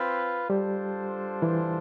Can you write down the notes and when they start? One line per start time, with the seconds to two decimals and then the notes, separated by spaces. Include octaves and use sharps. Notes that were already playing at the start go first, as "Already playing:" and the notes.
Already playing: C4 F4 B4
0.49 G3 D4 F4 G4 A4 C5
1.42 E3 E4